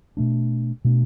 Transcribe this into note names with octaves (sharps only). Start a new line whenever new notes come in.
B2 A3 D4
B2 A3 D4